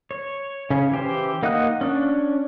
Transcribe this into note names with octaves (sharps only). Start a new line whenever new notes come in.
C#5
C#3 C#4
E3 G4 C5
A#3 D#4 F#5 D#6 F#6
C#4 D4